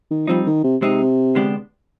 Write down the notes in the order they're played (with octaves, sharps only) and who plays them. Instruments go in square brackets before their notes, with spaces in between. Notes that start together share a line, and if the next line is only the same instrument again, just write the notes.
[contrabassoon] D#3
[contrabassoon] F3 [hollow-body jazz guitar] G3 C4 D#4
[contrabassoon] D#3
C3
[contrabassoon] C3 [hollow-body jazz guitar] G#3 C4 D#4
[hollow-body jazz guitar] D3 G#3 B3 D4 G4